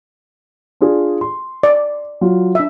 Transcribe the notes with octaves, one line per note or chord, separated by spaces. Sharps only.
D4 F4 G#4
C6
D5
F#3 F4
D4 E5